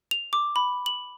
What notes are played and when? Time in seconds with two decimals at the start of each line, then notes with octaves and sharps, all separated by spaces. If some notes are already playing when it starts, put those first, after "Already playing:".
0.11 F7
0.33 D6
0.56 B5
0.86 F#7